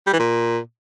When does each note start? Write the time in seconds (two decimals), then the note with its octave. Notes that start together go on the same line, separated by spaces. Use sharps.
0.07 G3
0.13 E3
0.19 A#2